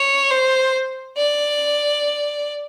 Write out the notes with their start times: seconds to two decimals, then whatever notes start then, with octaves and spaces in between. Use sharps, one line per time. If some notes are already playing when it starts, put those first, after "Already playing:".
Already playing: C#5
0.31 C5
1.17 D5